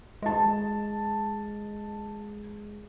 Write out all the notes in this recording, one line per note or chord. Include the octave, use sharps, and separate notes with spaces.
G#3 D#5 A5